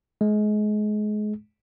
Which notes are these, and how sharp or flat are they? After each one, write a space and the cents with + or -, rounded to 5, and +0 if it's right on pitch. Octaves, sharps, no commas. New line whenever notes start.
G#3 +30